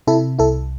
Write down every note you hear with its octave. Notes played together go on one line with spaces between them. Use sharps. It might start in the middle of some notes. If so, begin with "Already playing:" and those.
C3 E4 A4
C2 E4 A4